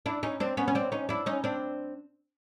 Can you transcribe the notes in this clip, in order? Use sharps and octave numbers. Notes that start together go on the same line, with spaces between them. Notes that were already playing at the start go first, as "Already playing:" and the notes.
D4 E4
C#4 D#4
C4 D4
B3 C#4
C#4
C4 D4
C#4 D#4
D4 E4
C#4 D#4
C4 D4